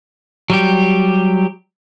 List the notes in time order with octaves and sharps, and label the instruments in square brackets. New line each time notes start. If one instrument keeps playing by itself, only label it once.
[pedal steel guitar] F#3 G3 G4